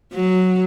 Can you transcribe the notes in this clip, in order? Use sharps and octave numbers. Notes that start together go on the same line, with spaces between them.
F#3